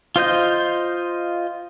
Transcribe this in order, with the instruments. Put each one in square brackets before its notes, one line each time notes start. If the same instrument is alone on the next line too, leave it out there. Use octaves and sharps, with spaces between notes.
[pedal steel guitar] F4 C5 D#5 G6